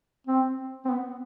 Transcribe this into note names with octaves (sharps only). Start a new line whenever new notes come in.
C4
C4
B3